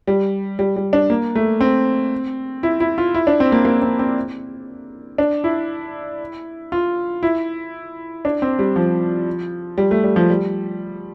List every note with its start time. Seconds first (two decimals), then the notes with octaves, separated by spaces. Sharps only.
0.07 G3
0.59 G3
0.76 G3
0.93 D4
1.10 A#3
1.36 A3
1.61 C4
2.63 E4
2.80 E4
2.98 F4
3.14 E4
3.27 D4
3.40 C4
3.52 A#3
3.65 A#3
3.82 C4
3.99 C4
5.18 D4
5.44 E4
6.72 F4
7.23 E4
8.25 D4
8.42 C4
8.59 G3
8.76 F3
9.78 G3
9.91 A3
10.04 G3
10.16 F3
10.30 G3